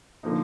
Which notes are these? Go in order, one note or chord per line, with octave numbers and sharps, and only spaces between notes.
D3 F3 A#3 D#4